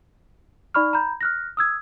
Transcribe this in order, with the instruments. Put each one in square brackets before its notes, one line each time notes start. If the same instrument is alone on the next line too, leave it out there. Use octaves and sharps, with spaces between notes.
[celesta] D#4 D5 B5 C#6 F6
A#5 B5 G6
F6 F#6 A#6
D#6 E6 G#6